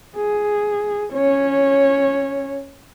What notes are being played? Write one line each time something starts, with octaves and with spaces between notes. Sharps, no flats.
G#4
C#4 C#5